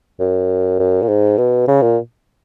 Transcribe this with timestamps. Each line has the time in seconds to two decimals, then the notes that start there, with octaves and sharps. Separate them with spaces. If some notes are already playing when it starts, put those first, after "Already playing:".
0.20 F#2
0.79 F#2
1.03 A#2
1.08 G#2
1.38 B2
1.68 C#3
1.82 A#2